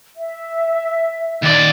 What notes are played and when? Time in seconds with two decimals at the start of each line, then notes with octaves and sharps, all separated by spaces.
0.17 E5
1.43 D#2 D5